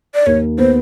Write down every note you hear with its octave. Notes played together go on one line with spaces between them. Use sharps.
D5
D#2 C#5
B3 C5